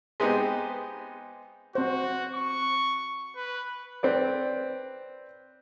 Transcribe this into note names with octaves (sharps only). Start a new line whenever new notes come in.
G#3 B3 C4 D#4 G4
C4 F#4 C5
C#6
B4
C4 B4 D5